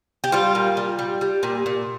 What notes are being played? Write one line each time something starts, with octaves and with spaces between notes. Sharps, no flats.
G4
G3 F4
A#2
G3
G3
G3
A#2
A#2